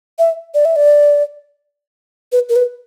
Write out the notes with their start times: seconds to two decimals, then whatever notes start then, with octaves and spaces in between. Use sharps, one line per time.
0.19 E5
0.54 D5
0.65 E5
0.76 D5
2.32 B4
2.49 A#4
2.56 B4